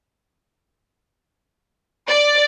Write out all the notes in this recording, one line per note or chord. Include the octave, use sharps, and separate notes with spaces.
D5